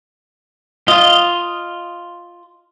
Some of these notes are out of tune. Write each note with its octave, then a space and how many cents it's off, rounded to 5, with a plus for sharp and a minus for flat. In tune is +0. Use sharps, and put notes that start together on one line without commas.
F4 +0 D#5 +0